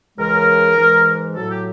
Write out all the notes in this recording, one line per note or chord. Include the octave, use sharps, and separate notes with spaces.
C#2 C#3 E3 G#3 A#4
G#2 E3 G#3
A2 F#3 A4
G4